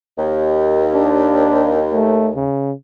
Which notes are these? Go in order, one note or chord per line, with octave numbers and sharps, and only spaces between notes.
D#2
D4
A3
C#3